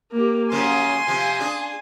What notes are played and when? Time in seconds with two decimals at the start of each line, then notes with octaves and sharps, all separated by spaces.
0.12 A#3 G4
0.52 F#2 C#3 F3 G#5 C6
1.07 C3 F3
1.40 D4 G#4